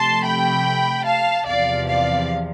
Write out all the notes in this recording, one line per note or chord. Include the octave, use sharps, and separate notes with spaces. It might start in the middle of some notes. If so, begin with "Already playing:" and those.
Already playing: C3 F3 A3 A5 C6
G5 B5
F5 A5
E2 C3 F3 D5 F5
D5 F5